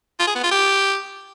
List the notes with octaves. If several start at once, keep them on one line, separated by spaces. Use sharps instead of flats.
F4
G#4
B3
F4
G4